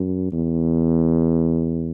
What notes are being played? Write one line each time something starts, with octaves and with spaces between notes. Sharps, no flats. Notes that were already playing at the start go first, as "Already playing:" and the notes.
Already playing: F#2
E2